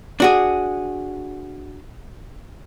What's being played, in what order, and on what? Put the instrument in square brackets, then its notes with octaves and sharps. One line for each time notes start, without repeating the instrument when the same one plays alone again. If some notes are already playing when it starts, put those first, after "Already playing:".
[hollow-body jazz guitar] D4 F#4 G#4